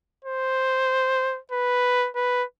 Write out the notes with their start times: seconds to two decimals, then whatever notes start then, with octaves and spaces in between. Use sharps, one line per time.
0.25 C5
1.52 B4
2.15 B4